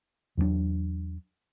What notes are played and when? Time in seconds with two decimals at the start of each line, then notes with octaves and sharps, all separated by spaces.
0.37 E2 F#3 A#3 D4